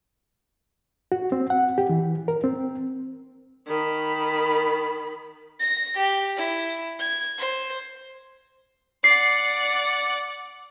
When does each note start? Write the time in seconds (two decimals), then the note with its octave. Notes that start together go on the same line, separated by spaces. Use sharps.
1.12 F#4
1.32 C4
1.50 F#5
1.78 G4
1.89 E3
2.28 A#4
2.44 C4
3.67 D#3 B5
5.60 A#6
5.97 G4
6.37 E4
6.99 G#6
7.38 C5
9.04 D5 F#5 C7